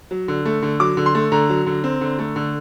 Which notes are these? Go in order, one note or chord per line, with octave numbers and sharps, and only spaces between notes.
F#3
D3
A3
D3
F#3 D6
D3
C6
A3
D3 A#5
F#3
D3
C4
D3
A3
D3